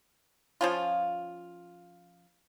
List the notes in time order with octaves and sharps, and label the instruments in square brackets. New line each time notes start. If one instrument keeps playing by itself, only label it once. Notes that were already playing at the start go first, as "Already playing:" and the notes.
[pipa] F3 C#4 F4